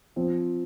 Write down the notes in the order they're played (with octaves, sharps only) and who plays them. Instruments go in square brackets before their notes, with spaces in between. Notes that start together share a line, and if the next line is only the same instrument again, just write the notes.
[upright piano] F3 C4